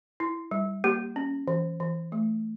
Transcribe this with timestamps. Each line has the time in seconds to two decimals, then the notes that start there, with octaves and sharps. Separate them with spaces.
0.20 E4
0.51 G3
0.84 A#3 G4
1.16 C#4
1.48 E3
1.80 E3
2.12 A3